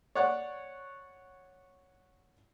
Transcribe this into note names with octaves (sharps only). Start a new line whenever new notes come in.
C#5 D5 F#5